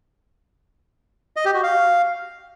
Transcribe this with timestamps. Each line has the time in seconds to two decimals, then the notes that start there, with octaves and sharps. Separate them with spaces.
1.36 D#5
1.45 G4
1.54 F#4
1.63 F5